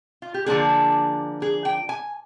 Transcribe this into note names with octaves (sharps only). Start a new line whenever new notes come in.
F4
G4
D3 F3 A#3 D4 G#4
G#4
G5
G#5